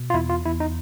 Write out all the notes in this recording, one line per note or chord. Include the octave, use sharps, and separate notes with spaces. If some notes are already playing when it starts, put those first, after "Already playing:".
Already playing: B2
F4
E2 E4
F4
E2 E4
D#4